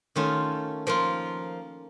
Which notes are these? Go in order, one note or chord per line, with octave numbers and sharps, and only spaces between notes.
D#3 A3 C#4 F4
F3 A#3 F4